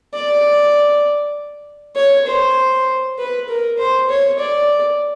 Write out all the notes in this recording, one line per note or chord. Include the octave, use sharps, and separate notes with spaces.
D5
C#5
C5
B4
A#4
C5
C#5
D5